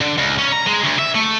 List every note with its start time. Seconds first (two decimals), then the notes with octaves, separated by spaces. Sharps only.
0.01 D3
0.18 C#2
0.39 C#4
0.52 A#5
0.66 G#3
0.84 D2
0.99 E5
1.15 A3